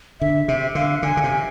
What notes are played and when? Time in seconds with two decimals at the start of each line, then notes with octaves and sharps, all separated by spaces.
0.21 D3 E5
0.48 C3 E5
0.75 D3 F5
1.03 D3 G#5
1.17 D3
1.24 C3